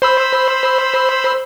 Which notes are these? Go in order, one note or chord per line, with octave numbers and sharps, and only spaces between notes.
C5 B5 E6